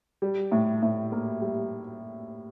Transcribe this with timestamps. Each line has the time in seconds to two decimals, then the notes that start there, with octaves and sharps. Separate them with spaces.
0.22 G3
0.52 A2
0.82 A2
1.12 A#3
1.41 G3